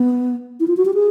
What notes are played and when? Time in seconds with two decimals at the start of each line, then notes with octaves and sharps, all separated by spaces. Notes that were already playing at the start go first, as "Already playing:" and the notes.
Already playing: B3
0.60 E4
0.68 F4
0.77 F#4
0.85 G4
0.94 G#4